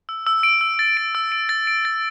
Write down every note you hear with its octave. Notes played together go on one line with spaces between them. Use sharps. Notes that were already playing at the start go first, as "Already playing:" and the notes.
E6
E6
D7
E6
A6
D7
E6
D7
A6
D7
A6